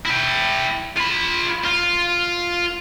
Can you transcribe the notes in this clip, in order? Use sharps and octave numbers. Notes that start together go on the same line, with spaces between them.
E4 G5
F4 B5
F4